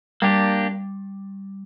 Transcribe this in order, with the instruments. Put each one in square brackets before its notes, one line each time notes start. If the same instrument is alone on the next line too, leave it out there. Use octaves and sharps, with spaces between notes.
[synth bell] G3 [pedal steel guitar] A#3 D4 G4